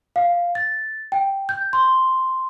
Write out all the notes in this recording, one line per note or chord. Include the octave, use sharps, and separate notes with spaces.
F5
A6
G5
G6
C6